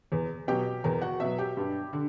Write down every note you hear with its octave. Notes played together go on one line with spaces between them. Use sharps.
E2
B2 F#3 G4 G5
E2 A#4 A#5
F#4 F#5
B2 F#3 E5
G4 G5
G2
D3